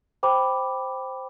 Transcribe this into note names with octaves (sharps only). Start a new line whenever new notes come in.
C5 G5 B5 D6